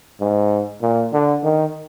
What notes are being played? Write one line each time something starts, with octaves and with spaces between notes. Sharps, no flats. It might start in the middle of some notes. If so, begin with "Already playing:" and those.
G#2
A#2
D3
D#3